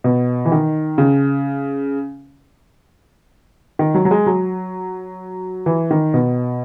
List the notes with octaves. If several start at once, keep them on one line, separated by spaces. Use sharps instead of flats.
B2
E3
D#3
C#3
D#3
F#3
F#3
G#3
F#3
E3
D#3
B2